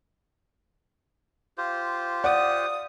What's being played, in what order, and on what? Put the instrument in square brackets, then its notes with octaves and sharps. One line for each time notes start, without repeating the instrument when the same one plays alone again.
[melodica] F4 G4 C5
[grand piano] D5 [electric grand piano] F#5 [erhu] D#6